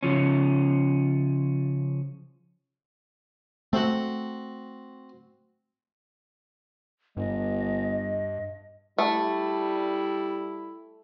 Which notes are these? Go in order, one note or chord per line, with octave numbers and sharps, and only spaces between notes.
C#3 F3 C#4
A3 C4 F#4
G1 G2 G3 D#5
G3 A3 E4